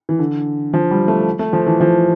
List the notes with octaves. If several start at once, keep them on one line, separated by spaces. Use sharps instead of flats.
E3
D3
F3
G3
A3
A3
F3
E3
F3